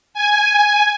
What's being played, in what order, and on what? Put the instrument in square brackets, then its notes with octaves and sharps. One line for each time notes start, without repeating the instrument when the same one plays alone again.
[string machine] G#5